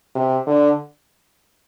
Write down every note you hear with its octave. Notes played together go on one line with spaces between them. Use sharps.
C3
D3